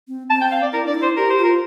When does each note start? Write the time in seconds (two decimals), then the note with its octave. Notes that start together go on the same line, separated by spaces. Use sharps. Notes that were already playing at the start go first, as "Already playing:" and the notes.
0.08 C4
0.30 C4 A5
0.41 G5
0.51 F5
0.62 D5
0.73 E4 A#4
0.86 D4 D5
0.95 E4
1.02 C5
1.16 G4 A#4
1.30 C5
1.39 F4
1.44 A#4